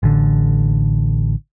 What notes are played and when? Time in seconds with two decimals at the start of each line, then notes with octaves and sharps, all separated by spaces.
0.03 A1 D3